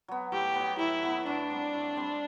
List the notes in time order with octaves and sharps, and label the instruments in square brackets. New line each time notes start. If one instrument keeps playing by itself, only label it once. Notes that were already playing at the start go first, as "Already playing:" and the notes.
[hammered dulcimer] F#3 B3
[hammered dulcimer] A2 [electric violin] G4
[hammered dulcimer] F#3 B3
[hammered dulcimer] A2 [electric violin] E4
[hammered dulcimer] F#3 B3
[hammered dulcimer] A2 [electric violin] D4
[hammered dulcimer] G3 C4
A2
G3 C4